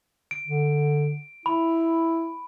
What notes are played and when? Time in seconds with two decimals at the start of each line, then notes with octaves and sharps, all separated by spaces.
0.31 D7
0.47 D3
1.46 E4 B5